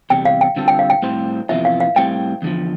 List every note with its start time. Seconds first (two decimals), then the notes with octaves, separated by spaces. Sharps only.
0.10 E2 C3 G3 G5
0.25 F5
0.41 G5
0.56 D3 G3 C4 F4 A4
0.68 G5
0.79 F5
0.90 G5
1.02 A2 G3 C4 G4 C5
1.49 F2 C3 E3 B3 F4 E5
1.65 F5
1.80 F5
1.96 A2 G3 C4 G5
2.42 E2 D3 F3